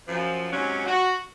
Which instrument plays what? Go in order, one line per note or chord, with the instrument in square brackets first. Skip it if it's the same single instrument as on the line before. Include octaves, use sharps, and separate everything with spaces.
[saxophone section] F#2 F3
G#2 C3 F#3 C#4
F#4